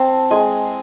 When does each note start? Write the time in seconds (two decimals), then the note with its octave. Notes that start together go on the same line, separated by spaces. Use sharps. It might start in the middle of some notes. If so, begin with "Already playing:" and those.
Already playing: C4 A5
0.31 G#3 G#5